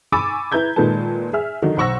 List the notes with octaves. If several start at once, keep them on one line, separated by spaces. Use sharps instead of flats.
G#5 B5 C#6 D6 E6 A6
E4 B4 A#5 G6 G#6
A#2 D#3 G#3 A4 B4 A5
G#4 E5 F6
D3 D#3 F#3 D4 D#4
B1 C5 F#5 C#6 E6 A#6